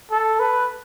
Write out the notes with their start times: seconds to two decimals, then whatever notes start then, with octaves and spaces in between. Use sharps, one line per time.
0.11 A4
0.40 B4